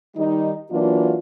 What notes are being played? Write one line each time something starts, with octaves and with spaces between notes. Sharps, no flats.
D#3 G3 D#4
E3 F#3 A#3 D4 F4